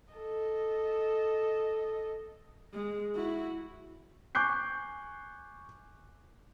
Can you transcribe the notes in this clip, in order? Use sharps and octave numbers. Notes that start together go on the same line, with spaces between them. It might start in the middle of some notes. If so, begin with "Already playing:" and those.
A4 D#5
G#3
E4 F#4
G#5 C#6 D6 F#6 G6 C7